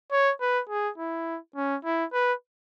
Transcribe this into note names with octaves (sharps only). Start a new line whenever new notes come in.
C#5
B4
G#4
E4
C#4
E4
B4